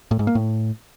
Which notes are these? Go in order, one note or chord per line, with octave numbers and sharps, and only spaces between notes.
A2
G#2
A#3
A2